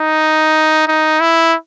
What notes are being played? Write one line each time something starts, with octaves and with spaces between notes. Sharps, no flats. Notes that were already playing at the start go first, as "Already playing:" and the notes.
Already playing: D#4
D#4
E4